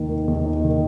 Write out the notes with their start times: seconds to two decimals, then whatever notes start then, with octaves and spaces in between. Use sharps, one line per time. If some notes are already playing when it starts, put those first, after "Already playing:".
Already playing: D#2 D#3 D#4
0.09 A#3
0.28 D#2
0.46 D#4
0.64 D#3